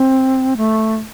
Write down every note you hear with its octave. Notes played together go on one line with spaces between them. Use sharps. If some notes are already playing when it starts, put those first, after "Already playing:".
Already playing: C4
A3